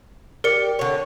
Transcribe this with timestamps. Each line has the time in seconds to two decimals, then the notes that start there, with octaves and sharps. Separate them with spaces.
0.44 G4 A#4 D5 C#7
0.79 D3 C#5